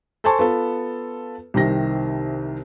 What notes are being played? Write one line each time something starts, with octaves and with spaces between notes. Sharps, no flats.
A4 C5 G#5 A5 C6 C#6
B3 F4 A4
C2 C3 D#3 A#6